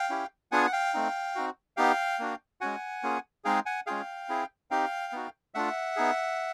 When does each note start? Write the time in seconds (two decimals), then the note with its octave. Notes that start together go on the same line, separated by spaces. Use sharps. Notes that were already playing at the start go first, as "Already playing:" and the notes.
Already playing: F5 G5
0.10 C#4 E4 G4
0.51 B3 D4 F4 G#4 F#5 G#5
0.66 F#5
0.72 F5 G5
0.94 A3 C4 D#4
1.36 C4 D#4 F#4
1.77 B3 D#4 G4 F5 G5
2.19 A#3 D4 F#4
2.61 G#3 C#4 F#4 F#5 G#5
3.03 A#3 C#4 F4 G#4
3.44 G#3 C4 D#4 G#4 F5 G5
3.66 F#5 G#5
3.86 G#3 C#4 F4 G#4 F5 G5
4.29 C4 E4 G#4
4.71 C4 D#4 G4 F5 G5
5.13 B3 D#4 F#4
5.54 A3 D4 F4 E5 F#5
5.96 B3 D#4 G#4